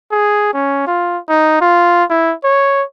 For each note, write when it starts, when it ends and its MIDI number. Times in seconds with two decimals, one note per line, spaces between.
0.12 0.51 68
0.54 0.82 61
0.87 1.18 65
1.29 1.59 63
1.61 2.04 65
2.10 2.34 64
2.44 2.83 73